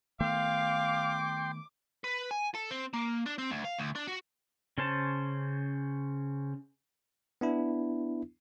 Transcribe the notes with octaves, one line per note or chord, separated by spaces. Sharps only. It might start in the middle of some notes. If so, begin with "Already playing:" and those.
D#3 A3 B3 F5 G5 C6 D6
B4
G#5
A4
C4
A#3
D4
C4
D2
F5
D2
D4
F#4
C#3 C#4 C5 A5
B3 D4 E4